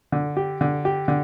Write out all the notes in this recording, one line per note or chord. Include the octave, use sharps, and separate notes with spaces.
D3
G4
D3
G4
D3